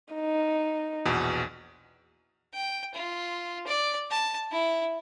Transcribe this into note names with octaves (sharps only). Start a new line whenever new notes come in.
D#4
A#1 E2 B2
G5
F4
D5
A5
E4